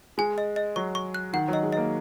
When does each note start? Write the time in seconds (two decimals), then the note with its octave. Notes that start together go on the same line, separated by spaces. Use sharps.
0.18 G#3 G#5
0.38 D#5
0.56 D#5
0.76 F#3 C#6
0.95 C#6
1.14 F#6
1.33 D#3 F#5
1.48 F#3 D#5
1.63 G#3
1.72 A#3 D#5